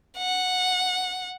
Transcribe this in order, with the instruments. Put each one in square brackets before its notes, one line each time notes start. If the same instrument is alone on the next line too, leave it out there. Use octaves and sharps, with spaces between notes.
[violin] F#5